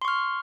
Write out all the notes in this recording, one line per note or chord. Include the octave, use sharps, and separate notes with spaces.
C6 C#6 F6